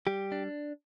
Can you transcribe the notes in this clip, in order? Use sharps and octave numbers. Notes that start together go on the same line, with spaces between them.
G3 G4
D4